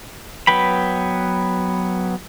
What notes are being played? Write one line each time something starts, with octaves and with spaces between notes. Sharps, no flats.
F#3 B3 B4 G5 B5